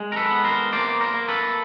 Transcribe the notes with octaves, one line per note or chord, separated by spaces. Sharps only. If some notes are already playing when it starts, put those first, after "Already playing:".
Already playing: G#3
A#4
A4 B4
B3
A#4 C5
A#3 C5 D5
A#4 C5
A#3
A4 B4